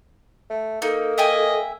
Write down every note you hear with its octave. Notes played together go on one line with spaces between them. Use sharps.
A3
A#3 D#4 A4
D#5 E5 G5 G#5